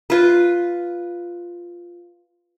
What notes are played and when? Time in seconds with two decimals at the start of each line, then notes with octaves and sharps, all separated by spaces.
0.10 F4 B4